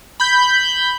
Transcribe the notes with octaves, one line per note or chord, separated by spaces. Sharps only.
B5 G6